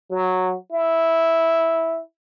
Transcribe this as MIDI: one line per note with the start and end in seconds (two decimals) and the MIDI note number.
0.11 0.55 54
0.72 2.00 64